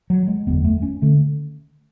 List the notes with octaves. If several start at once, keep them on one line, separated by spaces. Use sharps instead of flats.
F#3
G#3
F#1 E2 D3 B3
A3
C#4
D3 A3